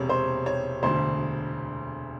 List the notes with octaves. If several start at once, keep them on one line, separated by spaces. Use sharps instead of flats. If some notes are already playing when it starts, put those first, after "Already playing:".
Already playing: E1 C3 C#5
C5
C#5
E1 D2 D3 C5